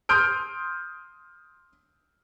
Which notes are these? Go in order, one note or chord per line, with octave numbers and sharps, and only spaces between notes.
C6 D#6 F6 G6 D7